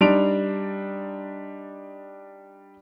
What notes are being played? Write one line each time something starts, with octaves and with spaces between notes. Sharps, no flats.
G3 D4 D#4 C6 D7 F7